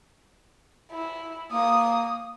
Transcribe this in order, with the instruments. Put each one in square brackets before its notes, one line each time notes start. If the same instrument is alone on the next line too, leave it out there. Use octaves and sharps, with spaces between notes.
[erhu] E4
[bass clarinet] A#3 [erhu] D#6